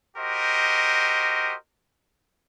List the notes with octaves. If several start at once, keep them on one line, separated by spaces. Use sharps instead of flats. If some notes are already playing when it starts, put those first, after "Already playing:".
F#4 G4 A#4 C5 D#5